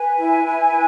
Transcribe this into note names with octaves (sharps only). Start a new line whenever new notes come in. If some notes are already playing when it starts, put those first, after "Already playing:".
Already playing: B4 G#5
E4
E4
B4